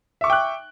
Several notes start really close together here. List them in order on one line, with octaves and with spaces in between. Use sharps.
E5 C#6 D6 G5 F#6